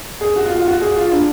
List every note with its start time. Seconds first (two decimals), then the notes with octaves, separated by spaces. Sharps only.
0.21 G#4
0.36 F#4
0.45 F4
0.56 F4
0.66 F#4
0.81 G#4
0.96 F4
1.12 D4